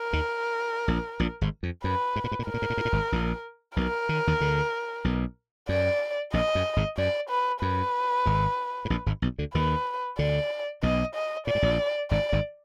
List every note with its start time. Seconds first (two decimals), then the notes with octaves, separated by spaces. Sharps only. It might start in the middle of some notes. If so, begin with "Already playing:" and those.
Already playing: A#4
0.13 D#2 D#3
0.88 A#1 A#2
1.20 A#1 A#2
1.41 G#1 G#2
1.63 F2
1.84 F#2 B4
2.16 G#2
2.24 A#2
2.32 G#2
2.39 A#2
2.47 G#2 A#4
2.54 A#2
2.62 G#2
2.70 A#2
2.77 G#2
2.85 A#2
2.92 G#1 G#2
3.12 A#1 A#2
3.76 B1 B2 A#4
4.09 D#3
4.27 D#2 D#3
4.40 D2 D3
5.04 B1 B2
5.69 F#2 D5
6.33 A#1 A#2 D#5
6.55 F#2
6.76 G#1 G#2
6.98 F#2 D5
7.29 B4
7.62 F#2 B4
8.26 G#1 G#2
8.85 G#2
8.90 A#1 A#2
9.06 G#1 G#2
9.22 B1 B2
9.38 D2 D3
9.54 D#2 D#3 B4
10.18 D2 D3 D5
10.83 B1 B2 D#5
11.15 D#5
11.47 A#2 D5
11.55 G#2
11.62 A#1 A#2
12.11 G#1 G#2 D5
12.32 G#1 G#2